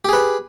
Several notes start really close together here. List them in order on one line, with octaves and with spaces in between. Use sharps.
G4 G#4 B4